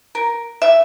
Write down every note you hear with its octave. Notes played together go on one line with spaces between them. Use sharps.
A#4
E5